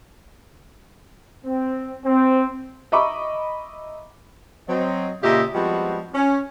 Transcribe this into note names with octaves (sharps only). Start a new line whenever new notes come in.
C4
C4
D#5 E5 A#5 B5 C#6 D6
F#3 C4 D#5
A#2 C#3 F4 G4 D#5 E5
F3 G3 G#3 B3 C4 F#4
C#4